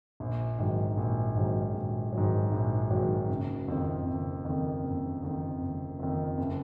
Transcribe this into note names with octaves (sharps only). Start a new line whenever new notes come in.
A#1
G#2 D#3 F#3
A#1
G#2 D#3 F#3
A#1
G#2 D#3 F#3
A#1
G#2 D#3 F#3
F#1
F2 D#3
F#1
F2 D#3
F#1
F2 D#3
F#1
F2 D#3
F#1